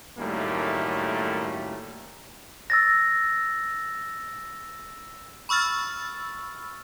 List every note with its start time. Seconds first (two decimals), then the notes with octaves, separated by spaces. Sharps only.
0.18 F#2 A2 D#3 G3 A3 A#3
2.70 E6 A6 A#6
5.49 B5 C#6 E6 F6 A6